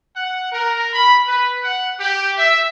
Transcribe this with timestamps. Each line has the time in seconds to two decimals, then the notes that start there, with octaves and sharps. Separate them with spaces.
0.16 F#5
0.52 A#4
0.93 B5
1.27 B4
1.63 F#5
1.99 G4
2.37 E5